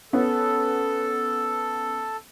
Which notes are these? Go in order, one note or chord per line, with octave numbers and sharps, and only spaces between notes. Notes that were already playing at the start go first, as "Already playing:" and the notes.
B3 C#4 A4